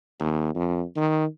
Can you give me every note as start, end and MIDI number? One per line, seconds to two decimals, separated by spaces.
0.20 0.53 39
0.55 0.82 41
0.97 1.24 51